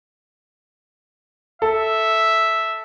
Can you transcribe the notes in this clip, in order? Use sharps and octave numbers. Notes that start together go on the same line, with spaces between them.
A4 E5